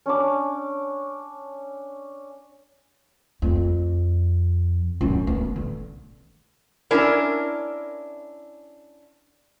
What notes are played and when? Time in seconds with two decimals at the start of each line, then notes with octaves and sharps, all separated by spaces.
0.06 C#4 D4 D6
3.42 F2
5.01 F#2
5.27 B3
5.56 D3
6.91 C#4 D4 E4 A#4